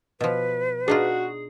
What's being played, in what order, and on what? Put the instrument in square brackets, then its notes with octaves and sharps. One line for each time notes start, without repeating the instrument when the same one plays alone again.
[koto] B2 F3 [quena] B4
[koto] D4 D#4 F4 [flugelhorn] F#4 [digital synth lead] G#4